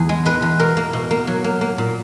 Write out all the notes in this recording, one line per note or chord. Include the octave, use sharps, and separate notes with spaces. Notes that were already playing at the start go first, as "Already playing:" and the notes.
Already playing: E2 G#4
G#3
G#3 B4
E2
B2 A#4
A#3
B2
A#3
F#3
A#3
A#3
A#2